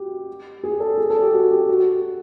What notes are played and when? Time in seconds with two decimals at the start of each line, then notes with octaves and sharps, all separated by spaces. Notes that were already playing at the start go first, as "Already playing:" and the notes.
Already playing: F#4 G4
0.64 G#4
0.80 A4
0.98 G#4
1.10 A4
1.21 G4
1.33 F#4
1.51 G4
1.69 F#4